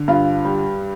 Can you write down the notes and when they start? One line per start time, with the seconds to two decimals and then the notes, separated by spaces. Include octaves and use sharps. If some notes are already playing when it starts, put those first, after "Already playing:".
Already playing: D3
0.08 G2 F4
0.45 G3